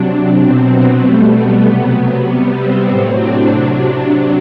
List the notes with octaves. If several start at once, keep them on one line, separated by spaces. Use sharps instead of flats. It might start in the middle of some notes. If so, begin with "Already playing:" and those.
Already playing: C3 F#3 D4
B2 F#3 C4
B3
B2 G3 A3
B3
C3 F#3
B3
C3 G3
C4
A2 F#3
D4
C3 F#3 D4
D4